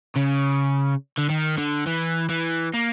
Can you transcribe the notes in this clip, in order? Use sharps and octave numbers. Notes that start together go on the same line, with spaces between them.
C#3
D3
D#3
D3
E3
E3
A#3